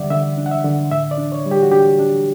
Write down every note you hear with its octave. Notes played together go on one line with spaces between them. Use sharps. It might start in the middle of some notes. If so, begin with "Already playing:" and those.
Already playing: D3 G3 D4 D5 E5 F#5
D3 E5
D4
F#5
E5
D3
A2 E5
D5
D4
C#5
G3
G4
F#4
D4 G4
D4